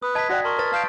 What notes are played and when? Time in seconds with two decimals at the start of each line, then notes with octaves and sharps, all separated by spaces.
0.02 B4 D#6
0.15 D#5 A5 G#6 B6
0.30 F#4 D5 F#5 G5 A#6
0.44 A#4 A5 C6 C#6
0.59 B4 F6 A6
0.72 F5 A5 F6 G6 D7